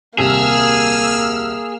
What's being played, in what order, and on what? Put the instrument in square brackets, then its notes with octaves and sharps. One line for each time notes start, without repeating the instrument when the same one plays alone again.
[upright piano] D#1 C2 C3 [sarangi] A#3 [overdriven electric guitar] G#4 [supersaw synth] E6 F6